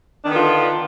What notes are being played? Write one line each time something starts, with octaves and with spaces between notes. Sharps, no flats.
D3 D#3 B3 D4 F4